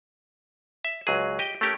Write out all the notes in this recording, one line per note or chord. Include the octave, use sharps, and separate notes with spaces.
E5
C#2 F#3 G#4
G4 D#5 G5
A3 C#4 G4 A#4